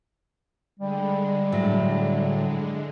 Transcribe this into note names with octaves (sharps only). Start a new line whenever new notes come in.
D3 G3 G#3
A2 F#3